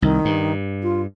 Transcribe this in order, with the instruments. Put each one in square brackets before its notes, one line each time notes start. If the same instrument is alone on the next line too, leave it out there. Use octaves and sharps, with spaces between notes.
[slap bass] C2 [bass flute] D#3
[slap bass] G2
[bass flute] F4